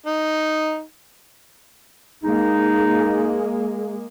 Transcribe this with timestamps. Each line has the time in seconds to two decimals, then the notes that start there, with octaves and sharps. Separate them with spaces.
0.06 D#4
2.24 G#3 A#3 D#4 G#4